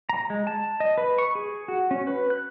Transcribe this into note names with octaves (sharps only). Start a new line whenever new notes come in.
A#5
G#3
A5
D#5
B4
C#6
G#4
F#4
C#4
B4
F#6